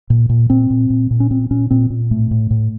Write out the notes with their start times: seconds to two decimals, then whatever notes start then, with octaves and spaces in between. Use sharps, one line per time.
0.10 A#2
0.29 A#2
0.50 A#2 C4
0.70 A#2
0.90 A#2
1.11 A#2
1.20 C#4
1.31 A#2 C4
1.51 A#2 C#4
1.71 A#2 C4
1.90 A#2
2.11 A2 A3
2.31 A2
2.51 A2